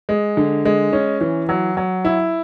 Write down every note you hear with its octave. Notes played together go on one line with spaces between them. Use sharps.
G#3
D3
G#3
C#4
E3
F#3
F#3
E4